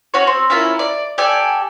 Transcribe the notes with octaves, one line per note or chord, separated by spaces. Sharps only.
C#4 F#4 C#5
C4
C#4 E4 F4 A#4
D5
G4 A4 D5 G#5